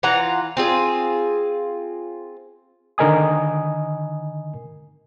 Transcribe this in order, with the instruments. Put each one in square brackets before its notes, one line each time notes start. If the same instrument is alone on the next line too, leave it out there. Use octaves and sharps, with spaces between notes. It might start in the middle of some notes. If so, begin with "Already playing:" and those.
[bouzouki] E3 F4 F#5 A#5
C4 F4 G#4
[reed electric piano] D3 D#3 A#4 D#5 G#5 D#6